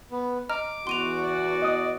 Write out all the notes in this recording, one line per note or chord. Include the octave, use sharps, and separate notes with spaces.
B3
D#5 A#5 D6 F6
E2 F#4 C6 D#7 F7
D5
D#5 D#6